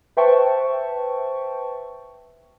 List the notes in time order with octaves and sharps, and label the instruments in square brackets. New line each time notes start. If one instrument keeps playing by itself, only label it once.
[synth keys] B4 C5 E5 G5 A5 C#6